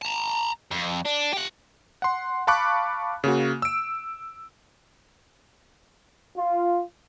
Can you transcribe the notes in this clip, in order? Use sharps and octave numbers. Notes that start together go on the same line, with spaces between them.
A5 A#5
F2
D4
G4 F#5
F#5 C6
F5 A5 B5 C#6 D6 F#6
C#3 A#3 F#4
E6 D7
F4